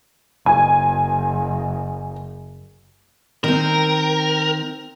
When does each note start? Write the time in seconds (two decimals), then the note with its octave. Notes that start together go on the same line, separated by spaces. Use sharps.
0.46 F#1 G#5
3.44 D#3 C4 A#4